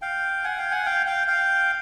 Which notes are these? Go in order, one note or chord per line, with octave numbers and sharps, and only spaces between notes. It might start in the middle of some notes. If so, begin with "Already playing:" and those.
F5 G5
F#5 G#5
F5 G5
F#5 G#5
F5 G5
F5 G5
F5 G5